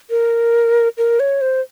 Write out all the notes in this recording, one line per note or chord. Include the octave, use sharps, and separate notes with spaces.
A#4
A#4
C#5
C5